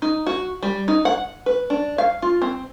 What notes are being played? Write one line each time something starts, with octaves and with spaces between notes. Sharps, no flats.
D#4
F#4
G3
D#4
F#5
B4
D4
F5
F4
C4